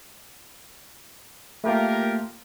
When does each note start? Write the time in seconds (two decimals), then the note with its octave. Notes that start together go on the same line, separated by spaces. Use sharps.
1.64 A3 A#3 F4 G4 A#4